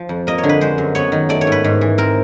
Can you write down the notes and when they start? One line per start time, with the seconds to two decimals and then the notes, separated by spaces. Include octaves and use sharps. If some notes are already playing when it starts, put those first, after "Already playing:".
Already playing: F3
0.09 F2
0.27 A#3 D#5
0.38 C#5
0.43 D3
0.49 B4
0.61 G#3 C5
0.78 F#2
0.95 B3 C#5
1.12 D#3
1.29 A3 D5
1.41 C#5
1.47 G#2 B4
1.64 G#2
1.81 E3
1.98 C4 A#4